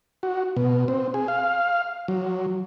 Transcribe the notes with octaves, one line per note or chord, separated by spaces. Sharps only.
F#4
B2
C4
G#4
F5
F#3